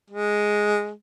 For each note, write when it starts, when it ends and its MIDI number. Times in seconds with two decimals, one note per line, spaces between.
0.10 0.91 56